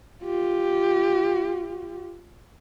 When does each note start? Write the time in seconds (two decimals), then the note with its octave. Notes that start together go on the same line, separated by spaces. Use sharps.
0.23 F4 G4